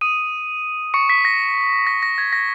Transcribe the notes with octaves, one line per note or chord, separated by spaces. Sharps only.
D#6 D#7
C#6 C#7
B6
A#6
A#6
A#6
G#6
A#6